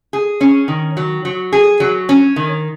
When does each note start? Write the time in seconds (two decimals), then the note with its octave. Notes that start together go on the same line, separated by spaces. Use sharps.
0.13 G#4
0.41 C#4
0.68 D#3
0.97 F#3
1.25 F#3
1.53 G#4
1.80 F#3
2.09 C#4
2.36 D#3